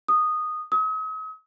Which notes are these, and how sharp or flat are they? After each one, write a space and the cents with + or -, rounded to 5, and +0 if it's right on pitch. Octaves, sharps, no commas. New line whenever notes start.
D#6 -10
D#6 +45